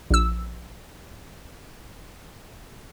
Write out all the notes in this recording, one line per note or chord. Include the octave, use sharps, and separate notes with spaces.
A#1 E6